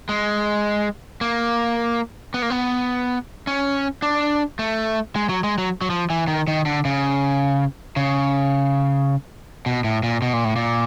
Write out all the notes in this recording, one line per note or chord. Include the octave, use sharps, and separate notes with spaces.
G#3
A#3
B3
A#3
B3
C#4
D4
A3
G#3
F#3
G#3
F#3
F#3
F3
E3
D#3
D#3
D3
C#3
C#3
B2
A2
A#2
B2
A#2
A2
A#2